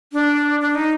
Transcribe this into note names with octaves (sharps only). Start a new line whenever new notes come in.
D4
D4
D#4